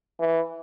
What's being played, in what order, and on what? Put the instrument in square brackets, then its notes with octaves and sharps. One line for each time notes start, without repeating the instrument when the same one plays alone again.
[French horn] E3